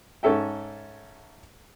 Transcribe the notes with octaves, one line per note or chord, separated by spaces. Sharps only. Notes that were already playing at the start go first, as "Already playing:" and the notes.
G#2 C#4 A4 E5 G5